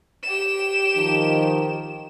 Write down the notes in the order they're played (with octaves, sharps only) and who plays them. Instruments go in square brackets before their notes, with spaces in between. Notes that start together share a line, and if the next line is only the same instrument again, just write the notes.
[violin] G4 E7
[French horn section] D#3 F3 D#4